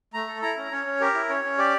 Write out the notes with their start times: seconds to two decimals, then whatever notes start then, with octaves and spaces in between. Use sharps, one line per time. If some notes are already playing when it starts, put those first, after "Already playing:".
0.14 A3 A#5
0.28 A4
0.42 E4 A#5
0.57 C#4
0.71 C#4 C#5
0.86 C#4
1.00 G4 A#4
1.14 E4
1.29 C#4 C#5
1.44 C#4
1.58 G4 D5